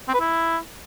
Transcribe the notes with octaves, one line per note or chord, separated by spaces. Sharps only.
C4
B4
E4